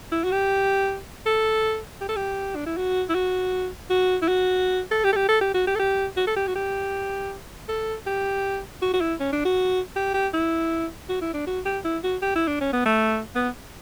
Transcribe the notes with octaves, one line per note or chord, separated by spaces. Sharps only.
E4
F#4
G4
A4
G4
A4
G4
D4
E4
F#4
E4
F#4
F#4
E4
F#4
A4
G4
A4
G4
A4
G4
F#4
G4
A4
G4
F#4
A4
G4
F#4
G4
A4
G4
F#4
F#4
E4
C#4
D4
F#4
G4
G4
E4
F#4
E4
D4
F#4
G4
E4
F#4
G4
E4
D4
C#4
B3
A3
B3